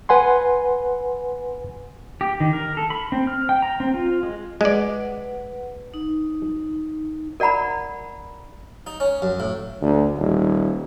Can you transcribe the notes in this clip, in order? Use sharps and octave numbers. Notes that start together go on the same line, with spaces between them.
B4 F#5 G#5 C6
G4
D#3
A#4
A4
B5
C4
F6
G5
A#5
C4
F4
G#3
G#3 B4 D5 F#5
D#4
A#4 D5 F#5 A#5 B5
D#4
C#4
F#2
A2
D2
D#1